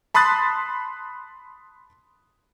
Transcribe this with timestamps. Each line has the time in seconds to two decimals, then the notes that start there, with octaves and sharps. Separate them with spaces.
0.14 A5 B5 C6 D#6 F#6 A6